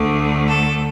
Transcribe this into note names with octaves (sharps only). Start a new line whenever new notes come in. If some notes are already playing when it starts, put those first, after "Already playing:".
Already playing: D2 D3 A3
A4